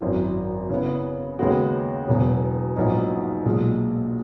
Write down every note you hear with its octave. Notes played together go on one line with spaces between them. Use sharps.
G#1 F#2 E3
C#3 E3 B3
D#2 C#3 G#3 B3 F#4
E1 E2 B2 F#3
A#1 G#2 F#3 B3 D#4
B1 A#2 G#3